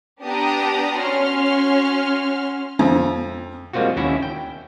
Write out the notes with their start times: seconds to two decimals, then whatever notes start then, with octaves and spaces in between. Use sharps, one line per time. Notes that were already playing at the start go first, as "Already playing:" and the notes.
0.22 B3 D4 G4 A#5 D#6
1.00 C#4 F#4 C6 F6
2.79 F2
3.73 G3 G#3 A#3 C4 F4 F#4
3.96 D#2 C#4 E4 F#4 E5
4.23 G5